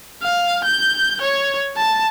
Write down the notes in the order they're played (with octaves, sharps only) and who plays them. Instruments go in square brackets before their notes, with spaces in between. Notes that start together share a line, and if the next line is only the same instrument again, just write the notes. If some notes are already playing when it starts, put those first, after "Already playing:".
[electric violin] F5
G6
C#5
A5